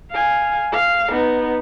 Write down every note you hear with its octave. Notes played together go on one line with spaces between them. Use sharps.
F5 G#5
F5
B3 D#4